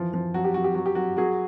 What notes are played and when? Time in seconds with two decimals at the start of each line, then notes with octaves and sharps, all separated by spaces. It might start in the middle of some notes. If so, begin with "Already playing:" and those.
Already playing: E3 F3
0.14 F3
0.34 F#3 F#4
0.44 G4
0.54 F#3 F#4
0.64 G4
0.75 F#3 F#4
0.86 G4
0.95 F#3 F#4
1.17 F#3 F#4 G#4